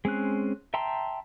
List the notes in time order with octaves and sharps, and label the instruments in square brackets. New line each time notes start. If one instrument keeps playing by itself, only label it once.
[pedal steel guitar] G#3 C4 C#4 F#6
E5 G5 A5 A#5 C6